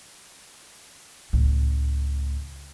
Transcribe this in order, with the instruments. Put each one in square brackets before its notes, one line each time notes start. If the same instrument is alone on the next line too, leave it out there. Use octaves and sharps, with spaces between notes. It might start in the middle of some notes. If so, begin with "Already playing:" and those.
[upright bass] C#2 A2